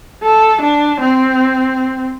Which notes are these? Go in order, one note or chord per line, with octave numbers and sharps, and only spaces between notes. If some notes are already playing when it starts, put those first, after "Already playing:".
A4
D4
C4